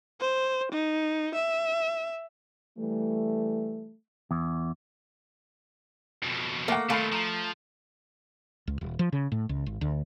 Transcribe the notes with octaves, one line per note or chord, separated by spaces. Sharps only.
C5
D#4
E5
E3 G3 A3
E2
F2 B2
A3 A#3 E5 F#5
A#2 D#3 A3 F5 B5 C7
F3 A#5
C#2
D#1
F3
C#3
A2
C#2
G#1
D2